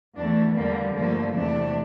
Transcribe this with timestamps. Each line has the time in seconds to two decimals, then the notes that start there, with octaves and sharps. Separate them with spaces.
0.16 E2 E3 A3 D4
0.55 E2 D3 G3 A#3
0.94 G2 D3 F3 A3 A#3
1.34 E2 C3 E3 A3 D4